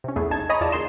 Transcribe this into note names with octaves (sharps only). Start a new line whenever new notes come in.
C3 C#4
B1 E2 A3 B3 G#4
A#1 D#4 A5 G#6
C#5 D#5 G#5 A#5 B5 D#6
E2 F4 D5 A5
C#3 A#3 D#4 C6 E7